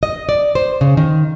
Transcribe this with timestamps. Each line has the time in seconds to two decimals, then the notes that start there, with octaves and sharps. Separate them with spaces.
0.03 D#5
0.29 D5
0.55 C5
0.81 C#3
0.97 D#3